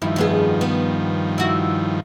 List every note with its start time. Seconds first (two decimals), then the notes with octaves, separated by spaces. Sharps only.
0.02 G2 D#3 F3 E4
0.16 F2 B3 G#4
0.61 B3
1.38 E4 F#4